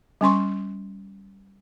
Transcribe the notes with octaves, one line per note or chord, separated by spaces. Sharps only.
G3 C#4 C6 C#6